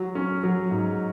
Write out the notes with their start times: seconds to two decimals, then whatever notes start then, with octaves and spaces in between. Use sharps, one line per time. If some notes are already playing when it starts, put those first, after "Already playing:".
Already playing: F#3
0.15 C#4
0.43 F#3
0.71 G#2